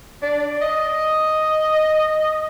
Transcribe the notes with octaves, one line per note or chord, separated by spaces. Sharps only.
D4
D#5